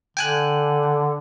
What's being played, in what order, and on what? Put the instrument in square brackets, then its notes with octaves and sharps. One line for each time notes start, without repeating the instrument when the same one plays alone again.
[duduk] D3 [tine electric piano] G5 G#5 F#6